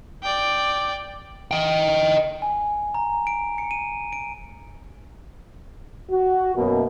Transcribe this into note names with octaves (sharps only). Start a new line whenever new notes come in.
D5 G5
D#5 G5
G#5
A#5
D7
C#7
D#7
D7
F#4
F#2 B2 A#3